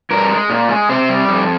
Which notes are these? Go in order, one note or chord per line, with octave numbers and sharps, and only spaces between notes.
G2 A#4
G#3
A#2
G#3
C3 C5
G3
F2